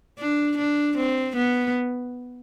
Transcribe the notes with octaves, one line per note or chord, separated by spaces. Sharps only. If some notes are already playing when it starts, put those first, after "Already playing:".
D4
D4
C4
B3